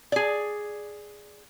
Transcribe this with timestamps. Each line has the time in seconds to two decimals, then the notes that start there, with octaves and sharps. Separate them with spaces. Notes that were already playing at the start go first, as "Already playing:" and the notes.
0.12 G#4 D5